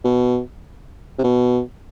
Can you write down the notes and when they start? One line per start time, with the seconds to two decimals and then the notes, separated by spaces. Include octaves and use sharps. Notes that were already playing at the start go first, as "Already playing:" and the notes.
0.04 B2
1.19 C3
1.24 B2